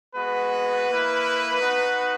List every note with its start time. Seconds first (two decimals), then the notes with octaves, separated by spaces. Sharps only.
0.16 G#3 B3 F#4 B4
0.88 A#3 E4
1.60 B3 D#4 F#4